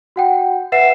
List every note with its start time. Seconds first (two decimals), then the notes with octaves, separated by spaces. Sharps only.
0.16 F#4 F#5 G5
0.72 B4 E5 F#5 C7 E7